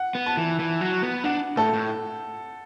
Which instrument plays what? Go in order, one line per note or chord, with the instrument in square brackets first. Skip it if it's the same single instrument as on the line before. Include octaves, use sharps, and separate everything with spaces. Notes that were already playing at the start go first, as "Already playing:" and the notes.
Already playing: [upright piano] F#5
[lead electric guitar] B3
[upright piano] A5
[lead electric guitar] E3
E3
F#3
B3
[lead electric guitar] D4 [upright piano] F#5
[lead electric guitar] A2 [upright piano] A4
[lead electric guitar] A2